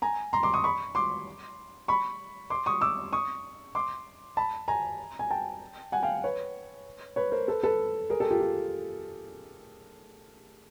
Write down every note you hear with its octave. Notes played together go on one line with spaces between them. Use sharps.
G#5 A#5
A#5 C6
C6 D6
C#6 D#6
B5 C#6
C6 D6
B5 C#6
C6 D6
C#6 D#6
D6 E6
C#6 D#6
C6 D6
A5 B5
G#5 A#5
G#5
G5 A5
F#5 G#5
F5 G5
B4 C#5
B4 C#5
A#4 C5
A4 B4
A4 B4
G#4 A#4
G4 A4
F4 G4
F4